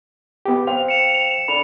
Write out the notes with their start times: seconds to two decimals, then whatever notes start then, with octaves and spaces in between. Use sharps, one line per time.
0.45 B3 G4
0.67 C5 F5 G5 F7
0.88 C#7 E7
1.48 D4 A4 B5 F7